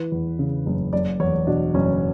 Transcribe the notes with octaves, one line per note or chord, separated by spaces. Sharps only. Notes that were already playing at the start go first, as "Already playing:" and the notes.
Already playing: E3 B4
E2
C#3
F#1
F#1 D5
E2 C#5
B2 D4
F#1 C#4